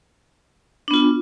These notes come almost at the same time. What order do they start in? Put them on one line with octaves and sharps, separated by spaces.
D4 B3 F4